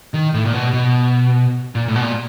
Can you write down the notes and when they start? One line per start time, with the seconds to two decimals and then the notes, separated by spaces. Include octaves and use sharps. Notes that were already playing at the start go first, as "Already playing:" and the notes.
0.14 D#3
0.34 A2
0.45 A#2
0.54 B2
0.73 B2
1.75 A#2
1.88 A2
1.96 B2
2.02 A#2